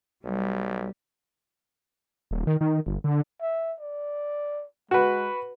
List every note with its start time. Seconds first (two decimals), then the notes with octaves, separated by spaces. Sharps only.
0.24 B1 G3
2.31 D#1
2.47 D#3
2.61 D#3
2.86 G1
3.04 D3
3.41 E5
3.80 D5
4.91 G#3 F#4 B4